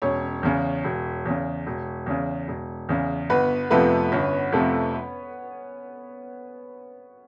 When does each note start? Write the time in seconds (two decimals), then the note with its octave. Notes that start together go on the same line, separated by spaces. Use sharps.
0.02 E1 C#4 C#5
0.43 E2 C#3
0.84 E1
1.25 E2 C#3
1.66 E1
2.06 E2 C#3
2.48 E1
2.89 E2 C#3
3.30 G1 B3 B4
3.70 F2 C3 F3 A3 B3 B4
4.12 G1 C#4 C#5
4.52 F2 C3 F3 A3